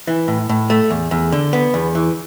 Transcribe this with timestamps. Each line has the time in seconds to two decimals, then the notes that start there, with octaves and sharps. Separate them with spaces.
0.07 E3
0.28 A2
0.49 A2
0.70 A3
0.90 E2
1.11 E2
1.32 D3
1.53 B3
1.74 E2
1.95 E3